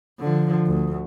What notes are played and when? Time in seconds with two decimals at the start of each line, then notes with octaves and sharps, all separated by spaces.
0.19 D3 F3
0.66 D2